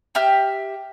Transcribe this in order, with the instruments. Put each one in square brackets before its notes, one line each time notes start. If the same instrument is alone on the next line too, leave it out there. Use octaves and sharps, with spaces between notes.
[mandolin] G4 E5 F6